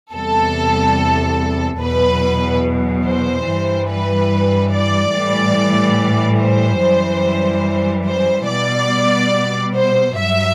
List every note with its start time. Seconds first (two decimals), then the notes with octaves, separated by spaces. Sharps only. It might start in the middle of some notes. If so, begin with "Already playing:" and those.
0.14 E2 C3 G3 A4
1.81 E2 B2 F#3 B4
3.06 C5
3.48 G2 E3 G3
3.89 B4
4.73 D5
5.14 A2 E3 G3
6.39 C5
6.82 F#2 E3 G3
8.06 C5
8.48 B2 G3 D5
9.74 C5
10.15 G2 F#3 E5